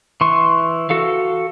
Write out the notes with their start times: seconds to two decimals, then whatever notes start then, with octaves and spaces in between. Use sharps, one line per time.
0.21 E3 C6 C#6
0.90 F#4 A4 F5